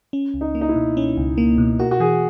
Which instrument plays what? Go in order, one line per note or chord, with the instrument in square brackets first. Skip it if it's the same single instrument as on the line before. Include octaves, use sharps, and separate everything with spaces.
[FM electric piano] C#4
C#2
[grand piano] D#4
[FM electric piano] A#3
[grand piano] D#4
E4
[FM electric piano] B2
C#4
C#2
A#3
B2
[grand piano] F#4 [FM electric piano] A#4
[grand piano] F#4
[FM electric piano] E3 [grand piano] G#4